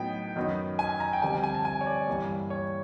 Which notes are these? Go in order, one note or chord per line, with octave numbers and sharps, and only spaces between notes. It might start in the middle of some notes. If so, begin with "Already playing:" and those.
Already playing: A2 F#3 B3 D#4 G5
F#2 D#3 F#3 B3 D#4
G#5
A#5
G5
F2 D3 G3 C4 G#5
G5
G#5
A5
G#5
C#5
D5
G2 E3 G3 A#3
C#5